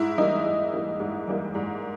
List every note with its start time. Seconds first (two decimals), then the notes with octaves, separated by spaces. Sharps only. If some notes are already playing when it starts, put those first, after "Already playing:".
Already playing: G#2 E4
0.18 E3 G3 A#3 D#4
0.45 G#2
0.73 E3 G3 A#3
1.00 G#2
1.28 E3 G3 A#3
1.55 G#2